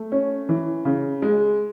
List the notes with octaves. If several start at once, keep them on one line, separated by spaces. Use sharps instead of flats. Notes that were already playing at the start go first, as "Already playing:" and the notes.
Already playing: A3
C#4
E3
C#3
G#3